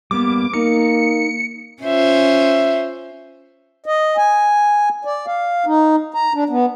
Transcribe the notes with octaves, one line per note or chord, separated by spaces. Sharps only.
G3 A#3 B3 D6
A#3 D#4 A#4 C#7
C#4 F4 C5 E5
D#5
G#5
D5
F5
D#4
A#5
D4
B3